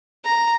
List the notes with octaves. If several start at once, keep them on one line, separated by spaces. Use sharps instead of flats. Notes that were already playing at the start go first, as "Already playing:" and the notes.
A#5